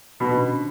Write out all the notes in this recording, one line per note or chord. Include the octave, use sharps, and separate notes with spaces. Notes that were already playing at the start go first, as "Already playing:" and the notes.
B2 D#4
D4
C#4
D3 D4
D3 D4